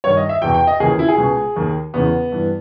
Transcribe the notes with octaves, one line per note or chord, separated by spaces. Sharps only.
G2 D#3 C#5
D#5
E5
E2 B2 G5
G5
D#5
D#2 C#3 E3 G#4
E4
G#4
C#2 B2
D#2 D#3
E2 C#3 E3 B3
G2 E3